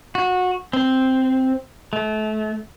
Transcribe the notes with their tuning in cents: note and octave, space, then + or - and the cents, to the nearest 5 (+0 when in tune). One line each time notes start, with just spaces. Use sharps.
F#4 -20
C4 +0
A3 -30